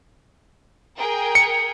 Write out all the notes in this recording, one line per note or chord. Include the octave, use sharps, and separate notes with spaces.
G#4 A#4 G5
C#7